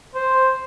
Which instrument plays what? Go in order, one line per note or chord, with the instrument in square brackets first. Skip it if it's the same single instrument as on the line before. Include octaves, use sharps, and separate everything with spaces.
[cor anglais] C5